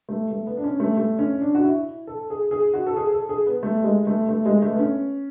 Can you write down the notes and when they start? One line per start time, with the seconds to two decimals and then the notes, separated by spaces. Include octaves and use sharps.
0.09 A3
0.31 A3
0.47 B3
0.57 D4
0.64 C#4
0.80 A3
0.97 A3
1.19 C#4
1.41 D4
1.55 F#4
1.64 E4
2.07 A4
2.30 G#4
2.51 G#4
2.74 F#4
2.87 A4
2.97 G#4
3.12 A4
3.29 G#4
3.46 B3
3.63 A3
3.84 G#3
4.07 A3
4.29 A3
4.46 G#3
4.62 A3
4.71 B3
4.79 C#4